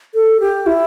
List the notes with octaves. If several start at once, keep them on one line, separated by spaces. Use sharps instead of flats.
A4
G4
E4